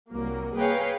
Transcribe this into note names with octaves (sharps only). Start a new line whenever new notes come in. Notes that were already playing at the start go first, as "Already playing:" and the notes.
C2 F#3 A#3
A#3 G#4 B4 C#5 F5 G5